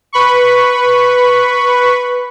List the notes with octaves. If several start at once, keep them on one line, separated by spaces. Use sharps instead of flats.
B4 B5 C#6